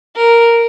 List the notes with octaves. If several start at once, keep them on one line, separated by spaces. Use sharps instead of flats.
A#4